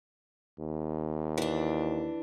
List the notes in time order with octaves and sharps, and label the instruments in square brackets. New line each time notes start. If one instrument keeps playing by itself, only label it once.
[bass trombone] D#2
[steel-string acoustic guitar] E3 D4